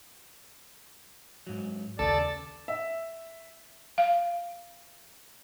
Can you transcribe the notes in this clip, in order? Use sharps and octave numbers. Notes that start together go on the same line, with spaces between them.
G#2 F#3
D#2 C#3 B3 A4 D5
E5
F5